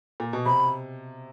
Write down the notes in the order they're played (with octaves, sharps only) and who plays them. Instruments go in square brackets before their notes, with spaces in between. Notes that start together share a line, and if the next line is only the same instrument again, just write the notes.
[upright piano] A#2
B2
[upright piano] C3 [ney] B5